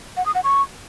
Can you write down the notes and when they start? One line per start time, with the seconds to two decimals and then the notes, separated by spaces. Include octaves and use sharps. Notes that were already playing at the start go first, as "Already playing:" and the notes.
0.17 F#5
0.26 D#6
0.35 F#5
0.44 C#6